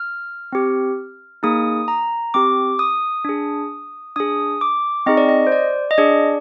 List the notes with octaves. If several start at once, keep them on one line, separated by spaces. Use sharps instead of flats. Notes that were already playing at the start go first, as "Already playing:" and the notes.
Already playing: F6
C4 G4
A#3 D#4 G#4 D#6
A#5
C4 G4 D6
D#6
D4 G#4
D4 G#4 D#6
D6
C4 D#4 G#4 D#5
D5
D#5
C5
D5
D#5
D4 G#4 D5